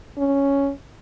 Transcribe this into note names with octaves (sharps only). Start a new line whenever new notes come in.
C#4